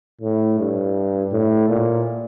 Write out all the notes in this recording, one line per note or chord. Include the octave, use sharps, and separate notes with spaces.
A2
G2
A2
A#2